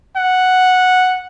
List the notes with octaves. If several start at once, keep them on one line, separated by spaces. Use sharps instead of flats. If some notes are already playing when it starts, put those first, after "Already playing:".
F#5